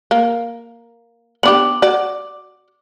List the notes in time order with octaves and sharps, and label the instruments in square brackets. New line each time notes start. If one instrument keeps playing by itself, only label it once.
[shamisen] A#3
[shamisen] B3 D4 G4 [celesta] D6 F#7
[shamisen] F#4 D5